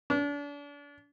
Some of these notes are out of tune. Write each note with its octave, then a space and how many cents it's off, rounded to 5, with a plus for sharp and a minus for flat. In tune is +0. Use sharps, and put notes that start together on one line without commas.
D4 -35